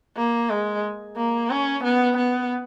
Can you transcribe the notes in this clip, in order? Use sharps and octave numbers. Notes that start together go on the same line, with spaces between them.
A#3
G#3
A#3
C#4
B3
B3